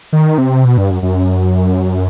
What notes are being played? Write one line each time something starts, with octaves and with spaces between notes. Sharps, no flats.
D#3
C3
B2
G2
F#2
F#2